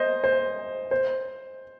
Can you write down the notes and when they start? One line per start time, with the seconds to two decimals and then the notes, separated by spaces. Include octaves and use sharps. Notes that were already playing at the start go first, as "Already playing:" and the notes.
Already playing: C5 D#5
0.24 C5
0.91 C5